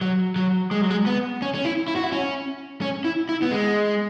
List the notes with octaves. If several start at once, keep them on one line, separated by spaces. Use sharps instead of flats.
F#3
F#3
G#3
F#3
G#3
B3
C#4
C#4
E4
E4
F#4
E4
C#4
C#4
E4
E4
B3
G#3